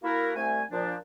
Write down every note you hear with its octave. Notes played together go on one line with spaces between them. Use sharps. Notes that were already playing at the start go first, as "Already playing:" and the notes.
A#3 E4 F#4 A#4
C2 A3 G#5
A#2 F3 D4